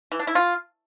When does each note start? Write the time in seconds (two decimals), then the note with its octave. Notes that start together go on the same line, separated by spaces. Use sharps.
0.12 E3
0.19 D4
0.27 E4
0.35 F4